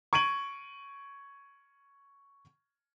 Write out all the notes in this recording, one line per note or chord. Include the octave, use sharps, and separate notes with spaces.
C#6 G#6 D7 D#7 F#7